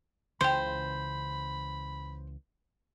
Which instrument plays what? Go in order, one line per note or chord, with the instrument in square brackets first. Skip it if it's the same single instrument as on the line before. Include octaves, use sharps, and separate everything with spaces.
[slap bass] C#2 C#3 E3 [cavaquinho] C5 [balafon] G5 C6 [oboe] B5